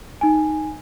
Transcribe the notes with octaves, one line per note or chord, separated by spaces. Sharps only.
D#4 G#5